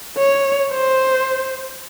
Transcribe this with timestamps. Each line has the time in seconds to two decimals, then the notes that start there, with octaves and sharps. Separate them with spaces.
0.18 C#5
0.72 C5